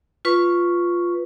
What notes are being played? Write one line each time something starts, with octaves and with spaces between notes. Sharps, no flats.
F4 B4 C#6